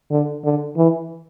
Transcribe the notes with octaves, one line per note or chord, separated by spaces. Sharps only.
D3
D3
E3